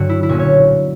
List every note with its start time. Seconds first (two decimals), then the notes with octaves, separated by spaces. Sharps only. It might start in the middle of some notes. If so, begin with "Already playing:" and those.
Already playing: G2 D3 F#3 F#4
0.09 E4
0.23 E4
0.29 B1 A#2 A#3 C#4 F#4
0.39 C#5